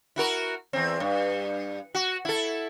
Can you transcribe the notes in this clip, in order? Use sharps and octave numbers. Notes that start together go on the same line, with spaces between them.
E4 F#4 A#4
E2 C4
G2
F#4
E4 A4